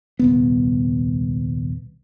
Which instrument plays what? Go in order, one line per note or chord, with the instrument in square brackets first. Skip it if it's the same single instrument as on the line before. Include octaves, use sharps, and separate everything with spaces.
[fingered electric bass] D#1 C2 B3